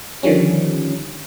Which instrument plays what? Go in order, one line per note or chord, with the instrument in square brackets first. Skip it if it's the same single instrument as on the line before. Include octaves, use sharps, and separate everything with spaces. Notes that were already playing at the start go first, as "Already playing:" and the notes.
[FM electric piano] D3 D#3 F3 G3 C#4